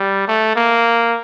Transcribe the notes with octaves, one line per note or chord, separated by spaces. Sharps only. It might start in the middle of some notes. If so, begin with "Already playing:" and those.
Already playing: G3
A3
A#3